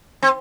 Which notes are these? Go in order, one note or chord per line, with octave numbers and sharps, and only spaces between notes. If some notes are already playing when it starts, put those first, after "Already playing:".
C4